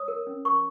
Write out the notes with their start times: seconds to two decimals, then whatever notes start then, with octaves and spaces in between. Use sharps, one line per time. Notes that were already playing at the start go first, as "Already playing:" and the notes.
Already playing: C#5 D#6
0.08 A#4
0.27 C#4
0.45 A#4 C#6